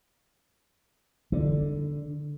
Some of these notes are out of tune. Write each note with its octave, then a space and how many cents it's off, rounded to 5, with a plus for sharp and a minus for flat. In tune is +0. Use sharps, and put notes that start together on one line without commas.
D3 +0